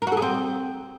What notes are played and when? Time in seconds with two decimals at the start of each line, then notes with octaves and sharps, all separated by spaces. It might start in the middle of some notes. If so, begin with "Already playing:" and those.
0.02 A#4
0.07 F#4
0.12 A4
0.17 G#4
0.22 C4